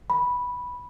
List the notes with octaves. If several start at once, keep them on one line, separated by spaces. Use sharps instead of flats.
B5